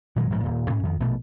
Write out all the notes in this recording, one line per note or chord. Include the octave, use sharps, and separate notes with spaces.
A#2 D#3 F#3 G#3
A#1 G#2 F3
D#1 A#2
G#2 C#4
F2 D#3
A#1 B2 A3